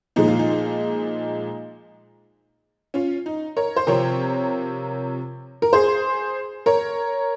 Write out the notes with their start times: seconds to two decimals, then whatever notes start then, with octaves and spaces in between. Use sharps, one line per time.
0.16 A#2 F3 G#3 D#4
0.28 F4
0.39 D#4
2.94 C#4 F4
3.26 D#4
3.57 A#4 C#5
3.76 C5
3.87 C3 F3 C4 A#4 C#5
5.62 A#4
5.73 G#4 C5
6.66 A#4 C#5